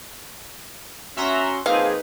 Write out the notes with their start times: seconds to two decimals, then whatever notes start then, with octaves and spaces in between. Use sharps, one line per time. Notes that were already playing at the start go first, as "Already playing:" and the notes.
1.17 C#4 F#4 E5 A#5 C6
1.66 F3 A#3 C4 D#4 G#4 B4 F5